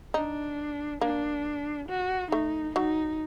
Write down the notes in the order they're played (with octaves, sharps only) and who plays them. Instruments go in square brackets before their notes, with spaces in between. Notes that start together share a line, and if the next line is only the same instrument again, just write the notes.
[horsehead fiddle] D4 [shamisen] D#4
[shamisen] A#3 [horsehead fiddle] D4
[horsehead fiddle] F#4
[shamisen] A3 [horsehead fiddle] D#4
[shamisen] F#3 [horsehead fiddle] D#4